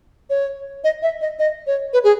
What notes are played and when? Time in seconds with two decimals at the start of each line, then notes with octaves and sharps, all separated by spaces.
0.30 C#5
0.84 D#5
1.02 E5
1.21 D#5
1.39 D#5
1.67 C#5
1.93 B4
2.04 G#4